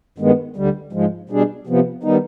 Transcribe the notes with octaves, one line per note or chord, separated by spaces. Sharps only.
G2 D#3 G#3 B3
D2 D3 G3
G#2 F3 G#3
B2 G3 D4 G#4
C3 F3 B3
D#3 G3 B3 D#4